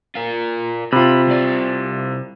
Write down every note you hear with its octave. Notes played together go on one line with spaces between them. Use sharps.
F4 A#4
C3 F4 B5
C2 D5